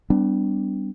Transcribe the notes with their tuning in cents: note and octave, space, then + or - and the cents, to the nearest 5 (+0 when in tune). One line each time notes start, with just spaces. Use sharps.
G3 +0 B3 +40 D4 +0